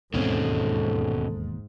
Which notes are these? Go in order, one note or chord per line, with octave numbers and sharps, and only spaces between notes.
E1 D#2 G#2 B2 C4 C#4 A4